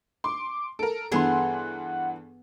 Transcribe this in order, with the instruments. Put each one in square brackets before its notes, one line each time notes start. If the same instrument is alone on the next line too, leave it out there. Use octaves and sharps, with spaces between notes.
[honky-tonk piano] C6 [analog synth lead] D6
[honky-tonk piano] A4 A#4 [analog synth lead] D7
[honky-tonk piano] G2 E3 C6 [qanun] B3 G#4 A4 [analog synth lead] F#5